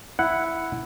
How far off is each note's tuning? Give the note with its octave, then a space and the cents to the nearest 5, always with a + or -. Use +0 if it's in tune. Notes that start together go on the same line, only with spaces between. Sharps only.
E4 +0 F#5 +0